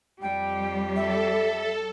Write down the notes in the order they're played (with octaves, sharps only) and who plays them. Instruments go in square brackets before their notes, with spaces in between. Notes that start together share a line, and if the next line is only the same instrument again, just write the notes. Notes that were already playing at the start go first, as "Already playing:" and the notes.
[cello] F2 G4 [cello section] G3 [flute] G5
[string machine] A4 [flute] E5